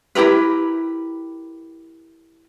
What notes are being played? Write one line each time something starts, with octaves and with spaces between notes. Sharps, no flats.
E4 G4 A#4 B4